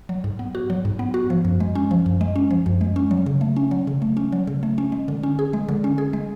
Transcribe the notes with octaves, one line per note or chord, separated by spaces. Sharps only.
F#3
G#2
B3
F#4
F#3
G#2
B3
F#4
F3
F#2
G#3
C#4
F3
F#2
G#3
C#4
F3
F#2
G#3
C#4
F#3
C#3
A3
C#4
F#3
C#3
A3
C#4
F#3
C#3
A3
C#4
G#3
D3
C#4
G#4
G#3
D3
C#4
G#4
G#3